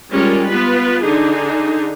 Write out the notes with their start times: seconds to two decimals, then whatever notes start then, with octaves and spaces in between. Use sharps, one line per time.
0.11 G3 G#3 C#4 F4 A#4
0.47 B3 F4 B4
1.03 D3 D#4 G#4